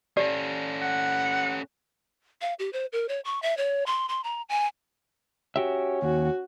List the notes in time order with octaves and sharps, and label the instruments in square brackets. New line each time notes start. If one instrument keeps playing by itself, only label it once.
[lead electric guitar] C#4 A4 [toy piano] G4 D5
[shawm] F#5
[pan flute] F5
G4
C5
A#4
C#5
C#6
E5
C#5
C6
C6
A#5
G#5
[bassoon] C#4 [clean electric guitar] F#4 G4 E5
[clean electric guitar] D#2 [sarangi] F#4